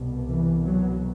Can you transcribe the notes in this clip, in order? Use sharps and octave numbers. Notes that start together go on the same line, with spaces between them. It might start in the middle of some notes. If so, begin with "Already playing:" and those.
Already playing: C2 B2
E3
F#3